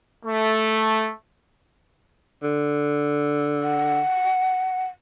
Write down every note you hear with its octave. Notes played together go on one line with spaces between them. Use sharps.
A3
D3
F#5